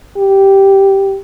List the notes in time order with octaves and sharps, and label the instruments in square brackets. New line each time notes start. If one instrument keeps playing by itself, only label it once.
[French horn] G4